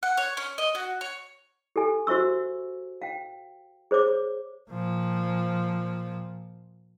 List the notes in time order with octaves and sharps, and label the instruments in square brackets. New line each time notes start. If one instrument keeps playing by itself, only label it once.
[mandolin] F#5
C#5
C#4
D#5
F#4
C#5
[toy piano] G4 A4 G#5
F#4 C5 E5 C#6 E6
F5 G5
G#4 C5 C#5 D6
[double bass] A#2 F3